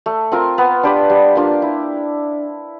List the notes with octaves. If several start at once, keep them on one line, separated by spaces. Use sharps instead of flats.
A3
C4 F4 A#4
B3
D4 G4 B4
G3
A#3 D4 F4
E4